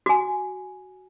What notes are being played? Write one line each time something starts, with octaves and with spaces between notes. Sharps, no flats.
F#4 G#5